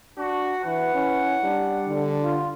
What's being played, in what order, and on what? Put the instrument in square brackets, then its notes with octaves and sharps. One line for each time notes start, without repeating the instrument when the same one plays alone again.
[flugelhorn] D4 [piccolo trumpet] F#4
[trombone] E3 [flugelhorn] B4 [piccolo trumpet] F#5
[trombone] C#4 [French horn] E4
[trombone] G3 [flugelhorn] D4
[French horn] D3
[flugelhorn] F4